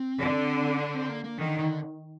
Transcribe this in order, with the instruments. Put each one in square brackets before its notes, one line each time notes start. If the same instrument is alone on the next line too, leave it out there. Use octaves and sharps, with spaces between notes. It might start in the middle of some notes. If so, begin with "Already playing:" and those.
Already playing: [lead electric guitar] C4
[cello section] D3
[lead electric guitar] D4
C4
A#3
A#3
[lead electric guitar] D3 [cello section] D#3
[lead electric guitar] D3